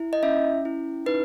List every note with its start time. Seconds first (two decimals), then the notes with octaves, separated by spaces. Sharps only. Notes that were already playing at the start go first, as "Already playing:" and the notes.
Already playing: E4
0.13 D#5
0.23 C#4 E5
0.65 E4
1.06 D#4 B4